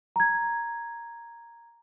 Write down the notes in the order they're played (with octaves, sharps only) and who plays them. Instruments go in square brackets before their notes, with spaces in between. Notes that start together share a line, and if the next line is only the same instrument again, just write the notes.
[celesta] A#5 G#6